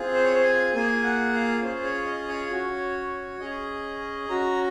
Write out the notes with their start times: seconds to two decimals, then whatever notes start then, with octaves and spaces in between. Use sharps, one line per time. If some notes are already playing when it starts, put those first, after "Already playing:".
Already playing: C4 F4 G#4
0.15 C5
0.24 C#5
0.34 C5
0.44 G#5
0.74 A#3 F4 G#4 G#5
1.03 F#5
1.33 F5
1.62 C#4 F4 G#4 C5
1.84 C#5
2.06 D#5
2.29 C#5
2.51 C#4 F#4
3.40 C#4 G#4 D#5
4.29 C#4 F#4 A#5